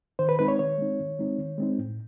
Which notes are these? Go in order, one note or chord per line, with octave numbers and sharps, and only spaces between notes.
D#3 C5
B4
G#3 C4 D#4 B4
C#5
D#3 C#5
G#3 C4 D#4
D#3
G#3 C4 D#4
D#3
G#3 C4 D#4
A2